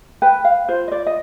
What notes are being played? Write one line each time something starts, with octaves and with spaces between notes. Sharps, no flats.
B4 G5
F5
F4 C5
D#5
D5
D#5